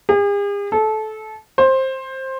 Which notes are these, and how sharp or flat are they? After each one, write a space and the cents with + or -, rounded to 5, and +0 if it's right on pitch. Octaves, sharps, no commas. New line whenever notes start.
G#4 -45
A4 -20
C5 +15